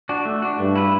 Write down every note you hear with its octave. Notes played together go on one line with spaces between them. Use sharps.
D4 F#4
A3
D4 F#4
G2 A3
E4 B4